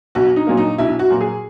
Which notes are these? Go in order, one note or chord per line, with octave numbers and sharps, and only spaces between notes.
B1 F#4
D#4
A#2 F#3 A#3
D#4
B1 E4
F#4
A#2 F#3 A#3
G#4